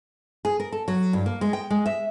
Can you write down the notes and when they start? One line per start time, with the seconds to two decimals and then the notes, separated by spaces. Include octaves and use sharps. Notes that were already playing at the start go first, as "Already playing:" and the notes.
0.45 G#4
0.60 A#4
0.72 A4
0.88 F#3
1.13 G2
1.26 A#3
1.41 G#3
1.53 G5
1.70 G#3
1.86 E5